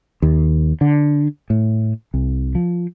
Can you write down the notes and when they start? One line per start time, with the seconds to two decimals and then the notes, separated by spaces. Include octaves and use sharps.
0.22 D#2
0.81 D3
1.50 A2
2.14 C2
2.55 F3